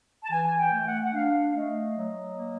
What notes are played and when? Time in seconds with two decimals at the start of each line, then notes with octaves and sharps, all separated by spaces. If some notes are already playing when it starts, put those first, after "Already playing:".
0.24 A5
0.31 E3 G#5
0.59 G5
0.72 A3
0.87 F#5
1.03 F#5
1.14 D4 F5
1.55 A3 D#5
1.95 F#3
2.37 A#3